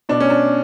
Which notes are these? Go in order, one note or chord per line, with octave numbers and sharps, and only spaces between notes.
B2 D4
C#4
D4